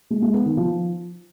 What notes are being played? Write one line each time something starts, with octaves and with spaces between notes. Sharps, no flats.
G#3
G#3
B3
D#3
F3